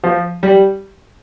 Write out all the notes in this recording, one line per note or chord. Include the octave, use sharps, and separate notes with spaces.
F3
G3